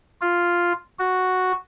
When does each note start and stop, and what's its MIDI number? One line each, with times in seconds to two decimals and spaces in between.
0.21 0.73 65
0.99 1.52 66